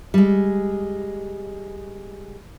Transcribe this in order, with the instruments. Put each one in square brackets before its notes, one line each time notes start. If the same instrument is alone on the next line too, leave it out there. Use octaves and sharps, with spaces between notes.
[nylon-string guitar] G3 G#3